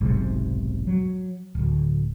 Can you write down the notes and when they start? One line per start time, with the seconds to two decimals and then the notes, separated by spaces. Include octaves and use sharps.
0.01 F1 B1 G#2 C3
0.87 F#3
1.55 D1 D2